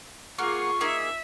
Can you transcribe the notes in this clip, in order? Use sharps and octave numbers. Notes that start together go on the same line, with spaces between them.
A#3 F4 G#4 F#5 C#6 F6
A#3 D#4 G#4 E5